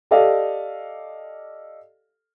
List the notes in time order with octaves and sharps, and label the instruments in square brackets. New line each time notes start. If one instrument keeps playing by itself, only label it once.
[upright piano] G4 A4 D5 D#5 F5